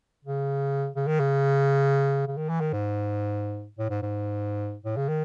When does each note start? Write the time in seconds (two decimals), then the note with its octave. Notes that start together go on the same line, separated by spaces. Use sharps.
0.25 C#3
0.96 C#3
1.07 D#3
1.20 C#3
2.28 C#3
2.37 D#3
2.49 E3
2.61 D#3
2.73 G#2
3.79 A2
3.90 G#2
4.02 G#2
4.85 A2
4.96 C#3
5.08 D#3